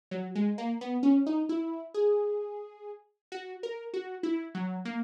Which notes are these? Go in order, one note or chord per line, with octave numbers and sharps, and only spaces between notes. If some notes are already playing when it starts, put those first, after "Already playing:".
F#3
G#3
A#3
B3
C#4
D#4
E4
G#4
F#4
A#4
F#4
E4
F#3
A#3